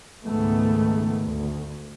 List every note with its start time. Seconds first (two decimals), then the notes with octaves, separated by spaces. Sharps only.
0.24 C#2 G#2 D#3 A3 B3
1.21 D2